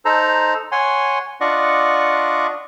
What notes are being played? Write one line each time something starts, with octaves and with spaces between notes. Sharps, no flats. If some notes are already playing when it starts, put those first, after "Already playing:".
D#4 A4 C5 A#5
C#5 F#5 G#5 C6
D4 F4 D5 D#5 F#5 C#6